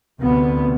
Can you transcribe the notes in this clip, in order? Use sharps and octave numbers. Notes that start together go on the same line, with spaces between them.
D2 C3 B3